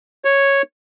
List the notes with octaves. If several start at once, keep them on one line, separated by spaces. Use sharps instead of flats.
C#5